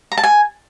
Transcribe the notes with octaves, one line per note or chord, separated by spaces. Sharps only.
A#5
A5
G#5